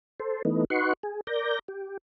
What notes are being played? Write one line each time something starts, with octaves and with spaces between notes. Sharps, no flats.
A4 C5
E3 A3 B3 D#4
D#4 F#4 B4 F#5 C6 C#6
G#4
A#4 D5 G6 A#6
G4